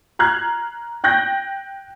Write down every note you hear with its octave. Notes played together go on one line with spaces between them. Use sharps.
A#5 F6 F#6 G#6 C7
G5 F#6 G6 A#6